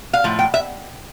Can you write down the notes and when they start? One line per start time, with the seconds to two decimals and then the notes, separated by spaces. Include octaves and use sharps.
0.13 F5
0.24 A2 F3
0.39 G5
0.54 E5